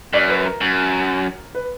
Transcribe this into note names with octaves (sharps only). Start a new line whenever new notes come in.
F#2 D5
B4
A#4
F#2
B4